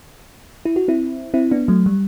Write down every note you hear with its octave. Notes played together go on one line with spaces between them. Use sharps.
E4
F#4
C4 E4
C4 E4
B3 D4
F#3 A3
G3